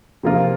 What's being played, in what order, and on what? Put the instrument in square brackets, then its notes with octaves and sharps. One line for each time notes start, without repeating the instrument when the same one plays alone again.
[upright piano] C3 F3 A#3 F4 A#4